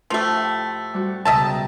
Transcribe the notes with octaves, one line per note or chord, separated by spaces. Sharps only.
A2 F3 A3 F4 G4
G3 C4 F#4
C#2 B2 D#5 E5 G5 A5 A#5